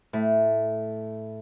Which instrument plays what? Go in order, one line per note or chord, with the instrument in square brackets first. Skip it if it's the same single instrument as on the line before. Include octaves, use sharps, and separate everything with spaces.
[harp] A2